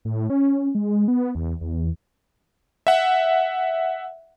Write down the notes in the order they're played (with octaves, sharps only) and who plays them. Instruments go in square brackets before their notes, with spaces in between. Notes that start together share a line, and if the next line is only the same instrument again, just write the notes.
[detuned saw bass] A2
C#4
G#3
B3
E2
E2
[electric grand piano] E5 F#5